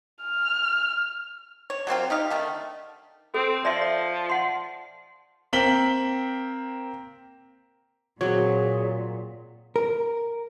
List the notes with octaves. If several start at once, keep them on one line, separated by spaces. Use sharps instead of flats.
F6
C#5
F#3 A#3 C4 F4
D#4 G4 F5
D3 D#3 A3
C4 A4
F3 D5 E5 C6
D5
F#5 C6
A#3 C4 A#4 B6 F#7 G7
A#2 F#3 C4 G#4 C#5
A#4